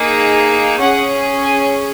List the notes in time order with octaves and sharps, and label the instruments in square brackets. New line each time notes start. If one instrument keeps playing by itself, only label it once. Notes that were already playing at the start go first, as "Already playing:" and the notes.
Already playing: [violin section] A#3 D#4 G#4
C#4 G#4 F#5
G#5